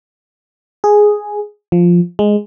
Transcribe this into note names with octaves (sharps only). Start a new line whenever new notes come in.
G#4
F3
G#3